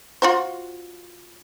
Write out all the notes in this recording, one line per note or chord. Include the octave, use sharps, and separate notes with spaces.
F4 F#4 C5